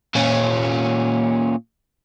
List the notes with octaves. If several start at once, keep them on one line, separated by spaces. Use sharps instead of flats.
A#2 C#4